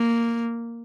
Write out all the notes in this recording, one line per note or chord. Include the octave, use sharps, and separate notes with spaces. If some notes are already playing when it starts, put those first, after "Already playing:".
Already playing: A#3